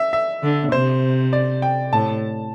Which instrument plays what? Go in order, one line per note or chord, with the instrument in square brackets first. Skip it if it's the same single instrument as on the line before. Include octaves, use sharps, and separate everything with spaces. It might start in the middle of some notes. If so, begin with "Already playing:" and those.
Already playing: [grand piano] E5
E5
[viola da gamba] D3
[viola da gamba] C3 [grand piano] C5
[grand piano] D5
G5
[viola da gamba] A2 [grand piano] A5